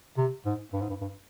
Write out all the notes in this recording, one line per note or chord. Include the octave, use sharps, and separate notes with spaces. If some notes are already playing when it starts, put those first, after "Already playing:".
C3
G#2
G2
G#2
G2
G2